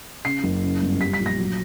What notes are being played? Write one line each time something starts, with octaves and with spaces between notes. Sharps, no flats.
C#3 C7
F#1
C#3
G1
G3 B6
B6
A#1
A#6
F#3